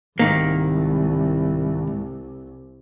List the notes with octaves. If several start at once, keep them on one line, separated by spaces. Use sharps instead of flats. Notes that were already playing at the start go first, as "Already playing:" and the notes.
C2 G#2 D#3 A#3